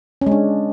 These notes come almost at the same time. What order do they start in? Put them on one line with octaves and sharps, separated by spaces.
C#4 G#3 D4